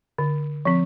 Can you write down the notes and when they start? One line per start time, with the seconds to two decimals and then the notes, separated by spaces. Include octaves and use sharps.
0.18 D3
0.65 F3 C4